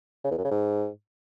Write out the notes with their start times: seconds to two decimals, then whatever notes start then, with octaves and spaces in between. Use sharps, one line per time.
0.24 C#3
0.31 E2
0.38 F#2
0.44 C#3
0.51 G#2